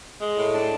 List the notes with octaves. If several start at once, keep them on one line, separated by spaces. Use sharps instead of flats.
G#3
A2
D4